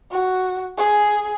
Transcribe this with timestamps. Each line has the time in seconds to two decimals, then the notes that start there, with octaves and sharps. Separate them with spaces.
0.11 F#4
0.78 G#4